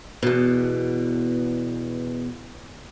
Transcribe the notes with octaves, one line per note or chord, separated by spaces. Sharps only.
E2 B2